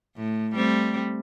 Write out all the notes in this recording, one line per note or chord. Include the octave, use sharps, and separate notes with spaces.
A2
G3 A3 C4